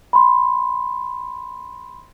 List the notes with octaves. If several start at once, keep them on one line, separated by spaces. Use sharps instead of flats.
B5 C6